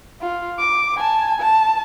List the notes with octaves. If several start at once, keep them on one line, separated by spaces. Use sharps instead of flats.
F4
D6
G#5 A5
A5